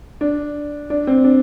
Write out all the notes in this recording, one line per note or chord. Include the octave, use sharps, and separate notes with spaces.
D4
D4
C4
D4